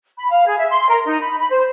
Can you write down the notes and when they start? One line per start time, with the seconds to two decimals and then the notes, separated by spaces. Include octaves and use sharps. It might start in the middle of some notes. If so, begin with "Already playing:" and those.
0.18 B5
0.31 F5
0.46 G#4
0.58 E5
0.71 C6
0.90 A#4
1.05 D#4
1.20 B5
1.39 B5
1.51 C5